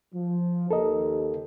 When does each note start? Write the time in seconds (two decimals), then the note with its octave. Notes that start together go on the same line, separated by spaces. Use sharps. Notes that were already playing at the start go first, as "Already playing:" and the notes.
0.15 F3
0.71 D#2 A4 A#4 D#5